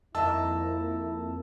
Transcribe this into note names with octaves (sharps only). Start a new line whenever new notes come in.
F2 D#3 A#3 E4 D#5 E5 A5 E6